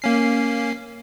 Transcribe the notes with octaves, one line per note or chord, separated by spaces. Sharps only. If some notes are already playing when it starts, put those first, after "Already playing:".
A#3 C#4 C7